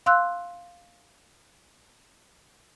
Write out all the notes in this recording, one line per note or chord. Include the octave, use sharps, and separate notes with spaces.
F5 C6 E6 F#6